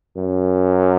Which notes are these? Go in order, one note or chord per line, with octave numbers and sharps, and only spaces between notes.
F#2